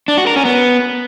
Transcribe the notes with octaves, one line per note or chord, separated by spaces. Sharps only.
D4
F#4
A#4
C#4
B3